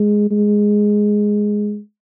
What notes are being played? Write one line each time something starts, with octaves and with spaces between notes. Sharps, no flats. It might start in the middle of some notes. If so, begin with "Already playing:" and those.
Already playing: G#3
G#3